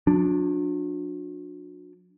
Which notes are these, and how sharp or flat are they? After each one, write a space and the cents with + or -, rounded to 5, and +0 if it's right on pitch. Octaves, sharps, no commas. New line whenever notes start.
F#3 -40 D4 +0